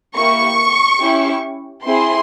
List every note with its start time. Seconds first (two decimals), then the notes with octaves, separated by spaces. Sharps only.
0.15 A#3 E4 G4 C#6
0.99 C#4 E4 G4
1.84 C4 E4 G#4 C6